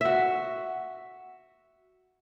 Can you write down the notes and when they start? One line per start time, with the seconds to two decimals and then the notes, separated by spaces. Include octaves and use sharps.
0.01 F#4 E5